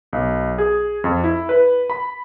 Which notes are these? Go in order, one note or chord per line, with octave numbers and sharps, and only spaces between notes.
B1
G#4
F2
E4
B4
B5